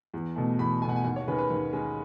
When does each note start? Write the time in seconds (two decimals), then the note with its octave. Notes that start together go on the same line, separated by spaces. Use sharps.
0.14 E2
0.36 B2 A3
0.59 E2 B5
0.82 A3 G#5
0.85 B2 F#5
0.96 G#5
1.04 D#2 F#5
1.16 C#5
1.28 D#3 G#3 C#4 B4
1.38 B4
1.50 D#2
1.73 D#3 G#3 C#4